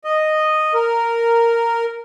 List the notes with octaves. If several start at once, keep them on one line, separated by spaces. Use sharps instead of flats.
D#5
A#4